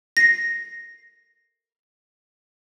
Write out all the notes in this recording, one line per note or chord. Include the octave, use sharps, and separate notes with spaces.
A#6 C7